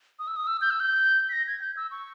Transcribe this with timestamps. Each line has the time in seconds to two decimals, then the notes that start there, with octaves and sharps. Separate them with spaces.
0.19 D#6
0.28 E6
0.36 D#6
0.47 E6
0.61 G6
0.71 E6
0.80 G6
1.29 B6
1.33 A#6
1.47 G#6
1.61 G6
1.77 E6
1.91 C#6